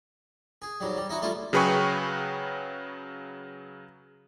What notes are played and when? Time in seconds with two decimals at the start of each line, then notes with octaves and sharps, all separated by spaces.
0.62 G#4
0.80 G#2 F#3 G3
0.97 G3
1.09 D#4 E4 F#4
1.22 G3 A3 E4 F4
1.53 C#3 F#3 G#4 B4 G5 C#6